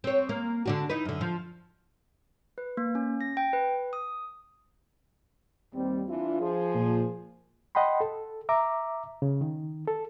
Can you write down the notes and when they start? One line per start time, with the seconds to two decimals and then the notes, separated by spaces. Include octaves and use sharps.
0.04 C4 C#5
0.29 A#3
0.66 D3 D4 F#4
0.90 D#4 E4 B4
1.05 F#2 D3
1.21 F3
2.58 B4
2.77 A#3
2.95 C#4
3.21 A#6
3.37 G5
3.53 B4
3.93 D#6
5.74 D#2 G3 C4
6.08 E3 D4 F4
6.40 F3 G#4
6.74 A#2
7.75 D#5 F#5 G5 B5 C6
8.01 A4
8.49 E5 A#5 D6
9.22 C#3
9.41 D#3
9.88 A4